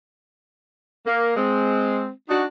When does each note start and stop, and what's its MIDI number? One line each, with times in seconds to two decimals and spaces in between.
1.06 1.34 58
1.36 2.09 56
1.36 2.09 60
2.29 2.44 62
2.29 2.44 63
2.29 2.44 66